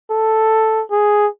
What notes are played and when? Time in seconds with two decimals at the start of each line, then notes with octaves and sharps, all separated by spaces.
0.11 A4
0.91 G#4